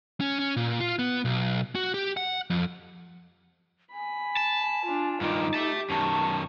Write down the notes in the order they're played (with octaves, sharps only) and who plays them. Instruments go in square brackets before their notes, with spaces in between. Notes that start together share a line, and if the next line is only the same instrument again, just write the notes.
[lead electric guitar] C#4
C#4
A#2
F4
B3
B1
F#4
G4
F#5
F2
[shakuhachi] G#5 [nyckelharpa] B5
[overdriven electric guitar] A5
[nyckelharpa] D4 F4
[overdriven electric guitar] G2 D#3 [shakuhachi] D#4 [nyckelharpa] F4 D6
[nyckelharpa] G4 [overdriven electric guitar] E5 A5
[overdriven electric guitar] F#2 D#3 [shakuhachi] A5 [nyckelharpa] C#6